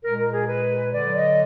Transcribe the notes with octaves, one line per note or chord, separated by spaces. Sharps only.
A#2 G#3 A#4
A#4
G#4
B4
D3 F#3 D5
D#5